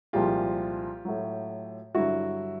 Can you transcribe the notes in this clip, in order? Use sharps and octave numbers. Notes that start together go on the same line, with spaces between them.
C2 A#2 F3 G#3 F4 G4
A2 F#3
G2 D3 F#3 E4 F#4